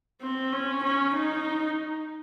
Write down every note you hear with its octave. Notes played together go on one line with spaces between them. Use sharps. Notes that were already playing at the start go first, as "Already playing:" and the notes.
C4
C#4
C#4
D#4